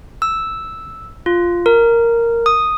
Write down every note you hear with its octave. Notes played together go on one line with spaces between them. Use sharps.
E6
F4
A#4
D#6